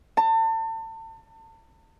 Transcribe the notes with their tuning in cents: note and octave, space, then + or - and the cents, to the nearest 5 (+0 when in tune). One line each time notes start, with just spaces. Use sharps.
A5 +35